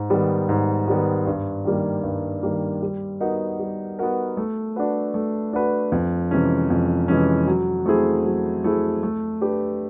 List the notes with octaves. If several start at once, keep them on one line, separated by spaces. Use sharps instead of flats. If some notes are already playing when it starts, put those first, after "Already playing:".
Already playing: G#2
D#3 G3 B3
G#2
D#3 G3 B3
G2
D#3 G3 A#3
G2
D#3 G3 A#3
G3
B3 D#4 F#4 A#4
G3
B3 D#4 F#4 A#4
A3
D4 F#4 B4
A3
D4 F#4 B4
F2
C3 E3 G#3 C#4
F2
C3 E3 G#3 C#4
F#3
A3 C4 E4 G#4
F#3
A3 C4 E4 G#4
A3
D4 G4 B4